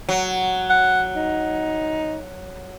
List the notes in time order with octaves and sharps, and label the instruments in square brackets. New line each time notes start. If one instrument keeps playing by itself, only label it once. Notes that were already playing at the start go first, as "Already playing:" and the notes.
[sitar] F#3
[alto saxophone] F#5
D#4